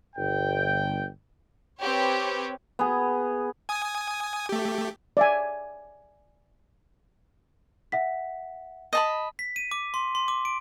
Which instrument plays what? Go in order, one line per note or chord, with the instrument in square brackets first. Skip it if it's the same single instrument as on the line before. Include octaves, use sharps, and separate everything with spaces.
[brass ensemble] G1 G5
[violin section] C4 G4 B4 C#5
[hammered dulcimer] B3 G#4
[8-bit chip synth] G#5 D#6
A3 G4
[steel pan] D5 E5 G#5
[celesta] E5 F#5 B6
[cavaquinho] D#5 A5 B5
[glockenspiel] B6
D#7
D6
C6
C6
D6
D7